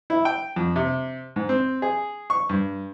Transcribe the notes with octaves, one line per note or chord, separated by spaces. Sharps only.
E4
G5
F2
C3
G#2
C4
G#4
C#6
G2